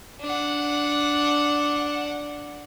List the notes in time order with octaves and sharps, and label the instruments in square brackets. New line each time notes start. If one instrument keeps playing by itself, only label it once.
[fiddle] D4 F#5